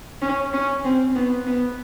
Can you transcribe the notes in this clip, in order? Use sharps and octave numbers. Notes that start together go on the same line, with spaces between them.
C#4
C#4
C4
B3
B3